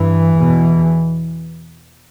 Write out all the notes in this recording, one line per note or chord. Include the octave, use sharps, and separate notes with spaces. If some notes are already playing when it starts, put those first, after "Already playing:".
Already playing: G2 E3
E2 B2